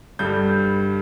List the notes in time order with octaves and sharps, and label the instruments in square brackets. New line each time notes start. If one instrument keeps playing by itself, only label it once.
[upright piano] G2 D3 G3 G6